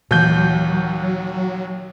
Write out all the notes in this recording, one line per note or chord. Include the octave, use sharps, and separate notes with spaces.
D#2 A#2 E3 F#3 G6